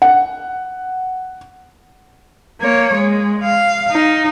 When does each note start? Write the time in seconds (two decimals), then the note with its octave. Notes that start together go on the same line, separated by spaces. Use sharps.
0.02 F#5
2.61 A#3 C#5
2.94 G#3
3.44 F5
3.92 D#4